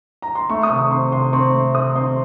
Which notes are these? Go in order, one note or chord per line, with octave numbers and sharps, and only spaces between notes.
A#5
C6
A3 C#6
D#6
C3
C#6
C4 C6
C3 C6
C4 C#6
A3
C3 D#6
C4 C6